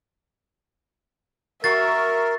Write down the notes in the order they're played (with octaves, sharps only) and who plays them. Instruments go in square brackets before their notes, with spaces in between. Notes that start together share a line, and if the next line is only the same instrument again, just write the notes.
[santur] F#4 C6 C#6 [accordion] A#4 [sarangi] E5 [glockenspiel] A6